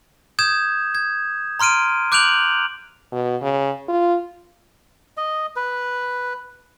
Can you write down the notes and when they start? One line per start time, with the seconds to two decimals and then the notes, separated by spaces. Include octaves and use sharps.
0.39 D#6 G6 G#6 E7
0.95 G#6
1.60 A#5 C6 F6 D7 D#7
2.12 D6 F#6 G6 D7 F7 F#7
3.12 B2
3.42 C#3
3.88 F4
5.17 D#5
5.56 B4